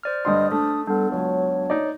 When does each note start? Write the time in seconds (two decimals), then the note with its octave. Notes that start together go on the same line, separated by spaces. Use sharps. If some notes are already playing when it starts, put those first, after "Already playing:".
0.03 C5 D5 F6
0.25 G2 D3 D#5 C6 D#6
0.52 A3 D4
0.87 G3 B3 D4 A4
1.12 C#2 F#3 C#5
1.70 D#4 D5